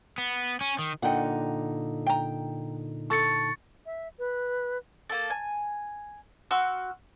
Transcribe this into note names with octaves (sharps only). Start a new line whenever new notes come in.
B3
C#4
D#3
A#2 D3 D#4 F#5 G5
G5 A#5
A4 C#6 A6 C#7
E5
B4
A#3 A4
G#5
F#4 C6 E6 F6